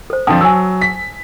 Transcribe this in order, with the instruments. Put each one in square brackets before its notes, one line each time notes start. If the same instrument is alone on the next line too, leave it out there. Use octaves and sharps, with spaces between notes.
[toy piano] A4 C5
[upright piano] F2 D3 F3 [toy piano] A5 D#6
[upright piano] F#3 [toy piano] G#5 E6
[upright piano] B6